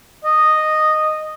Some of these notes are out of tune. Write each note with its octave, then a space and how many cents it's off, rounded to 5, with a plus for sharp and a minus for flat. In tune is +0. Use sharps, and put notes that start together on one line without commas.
D#5 -10